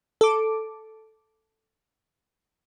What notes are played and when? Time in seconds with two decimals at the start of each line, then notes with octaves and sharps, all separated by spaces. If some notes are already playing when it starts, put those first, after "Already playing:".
0.21 A4 D6